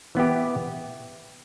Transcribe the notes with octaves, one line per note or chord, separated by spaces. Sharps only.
E3 B3 E4 G4